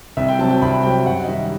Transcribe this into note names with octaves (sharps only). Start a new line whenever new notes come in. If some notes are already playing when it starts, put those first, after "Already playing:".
C2 E5
G5
C3 F#3 A5
G5
C2 B5
C3 F#3 G5
F#2 F#5
D#5
D#3 G3 E5